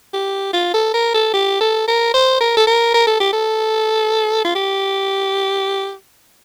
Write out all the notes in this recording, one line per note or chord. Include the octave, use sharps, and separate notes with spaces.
G4
F4
A4
A#4
A4
G4
A4
A#4
C5
A#4
A4
A#4
A#4
A4
G4
A4
F4
G4